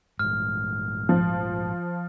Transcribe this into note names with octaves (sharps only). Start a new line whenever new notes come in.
A#1 G#2 F6
F3